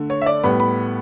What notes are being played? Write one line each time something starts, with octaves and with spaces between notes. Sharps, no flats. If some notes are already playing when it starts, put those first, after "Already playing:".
Already playing: D3 A3
C#5
E5
D5
A2 G3 B3 B5
B5